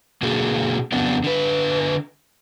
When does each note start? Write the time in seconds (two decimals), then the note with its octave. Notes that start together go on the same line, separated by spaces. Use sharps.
0.22 B2 D3 A#3 F#4 G#4 A4
0.92 F2 C#3 F#3 B3 C#4 D4
1.24 D3 B4